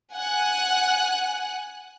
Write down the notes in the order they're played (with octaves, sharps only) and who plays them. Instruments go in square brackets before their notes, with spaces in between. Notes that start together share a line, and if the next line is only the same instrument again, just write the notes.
[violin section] F#5 G#5 F#6